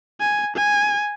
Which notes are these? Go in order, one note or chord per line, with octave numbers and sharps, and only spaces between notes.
G#5
G#5